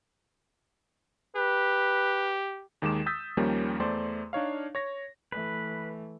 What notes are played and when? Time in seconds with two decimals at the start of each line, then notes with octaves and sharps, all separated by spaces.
1.36 G4 B4
2.82 D#2 D#3 G#3 D6 E7
3.06 D#6 E6 G6 A6 B6
3.37 D#2 D#3 F3 G3 A#3 C#4
3.80 E2 A3 C5 D5 C6
4.33 D4 D#4 C#5 F5
4.75 C#5 A#6
5.32 E3 A3 B4